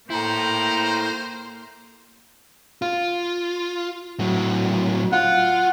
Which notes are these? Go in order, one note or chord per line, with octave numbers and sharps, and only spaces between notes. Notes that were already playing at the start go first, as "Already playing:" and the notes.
A#3 E4 A4 C5 G5 A#5
F4
A2 F#3
F4 F#5